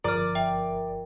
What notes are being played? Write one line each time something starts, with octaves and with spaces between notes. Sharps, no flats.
G1 F3 A#4 D5 A#5 F6
E5 G5